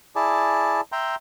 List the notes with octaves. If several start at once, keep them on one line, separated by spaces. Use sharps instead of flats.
E4 G#4 D5 A5
E5 G5 A#5 C6